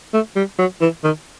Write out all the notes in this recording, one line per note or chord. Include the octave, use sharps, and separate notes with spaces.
A3
G3
F#3
E3
D#3